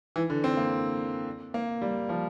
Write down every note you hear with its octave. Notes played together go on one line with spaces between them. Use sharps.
E3
D3
C4
A#3
A#3
G3
F3